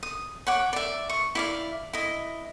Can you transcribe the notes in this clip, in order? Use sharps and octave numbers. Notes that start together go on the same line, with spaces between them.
D#6
C#5 F#5 D6
D5 E5
C#6
E4 D5 F5
E4 D#5